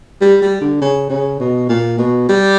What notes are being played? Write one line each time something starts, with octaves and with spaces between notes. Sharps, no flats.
G3
G3
D3
C#3
C#3
B2
A#2
B2
G3